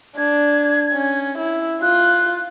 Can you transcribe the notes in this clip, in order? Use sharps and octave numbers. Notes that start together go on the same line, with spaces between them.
D4 G#6
C#4
E4
F4 F#6